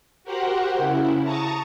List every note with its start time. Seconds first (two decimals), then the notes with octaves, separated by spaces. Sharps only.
0.24 F#4 G4 A#4 C5 F#5
0.78 C#3 E4
1.23 A5 A#5 C#6 D#6 A6